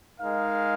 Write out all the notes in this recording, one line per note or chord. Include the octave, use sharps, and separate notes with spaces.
G#3 D#4 A#4 F5